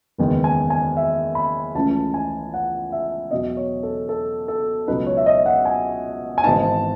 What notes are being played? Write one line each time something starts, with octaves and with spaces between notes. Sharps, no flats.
F#1 E2 D#3 G#3
G#5
G#5
E5
B5
C#2 C#3 E3 A3 C#4 A5
G#5
F#5
E5
E2 B2 F#3 D#5
C#5
A4
A4
A4
C#2 B2 F#3 B3 D#4 B4
C#5
E5
D#5
F#5
G#5
G#5
G#1 G#2 E3 B3 D#4 A5